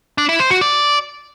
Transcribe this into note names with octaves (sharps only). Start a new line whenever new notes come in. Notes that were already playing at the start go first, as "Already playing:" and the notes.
D4
E4
C5
F#4
D5